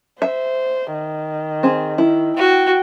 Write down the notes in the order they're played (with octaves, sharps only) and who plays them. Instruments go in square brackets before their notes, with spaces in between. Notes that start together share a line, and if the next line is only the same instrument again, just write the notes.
[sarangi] C5 [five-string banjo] E5
[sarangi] D#3
[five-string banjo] C4 G#4
E4
[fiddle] F#4 [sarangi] G5